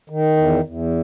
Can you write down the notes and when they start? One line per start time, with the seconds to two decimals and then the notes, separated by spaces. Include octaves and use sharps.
0.10 D#3
0.37 E2
0.64 E2